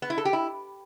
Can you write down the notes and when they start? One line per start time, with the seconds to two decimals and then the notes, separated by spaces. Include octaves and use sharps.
0.02 B3
0.10 E4
0.18 A4
0.25 G4
0.33 E4